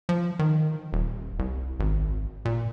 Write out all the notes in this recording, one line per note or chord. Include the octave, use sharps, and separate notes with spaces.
F3
D#3
D#1
C2
G#1
A#2